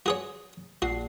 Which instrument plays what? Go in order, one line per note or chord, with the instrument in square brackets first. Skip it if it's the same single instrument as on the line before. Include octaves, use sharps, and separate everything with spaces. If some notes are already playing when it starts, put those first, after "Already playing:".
[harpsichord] F#4 G#4 C#5
[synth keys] A#1 C7 [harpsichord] F#4